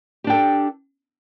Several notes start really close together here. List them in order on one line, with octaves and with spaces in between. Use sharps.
G4 D4 G5 A4